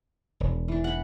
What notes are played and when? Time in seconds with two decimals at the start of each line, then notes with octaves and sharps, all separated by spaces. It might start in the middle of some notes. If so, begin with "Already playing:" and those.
0.40 E1
0.68 E3 D4
0.84 F#5 B5